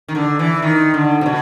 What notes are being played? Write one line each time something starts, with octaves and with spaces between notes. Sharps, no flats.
D#3
D3
E3
D#3
D3
C3
B2